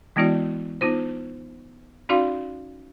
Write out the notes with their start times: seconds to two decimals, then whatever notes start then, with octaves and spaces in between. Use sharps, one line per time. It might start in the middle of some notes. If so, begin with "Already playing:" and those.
0.16 E3 G#3 B3 E4 F#4 D5
0.81 B3 D#4 F4 C5
2.09 C#4 D#4 F#4 D5 F5 C6